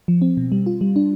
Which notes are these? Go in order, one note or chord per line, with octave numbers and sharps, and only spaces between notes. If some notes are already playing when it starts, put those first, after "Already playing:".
F3
C4
B2
G3
F4
G3
D4